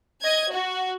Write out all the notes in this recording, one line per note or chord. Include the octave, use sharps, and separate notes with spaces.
D#5 G#6
F#4